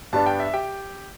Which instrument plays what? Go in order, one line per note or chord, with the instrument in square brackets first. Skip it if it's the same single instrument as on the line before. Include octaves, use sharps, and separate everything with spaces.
[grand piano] G2 G3 B3 D4 A5
G5
E5
G4 G5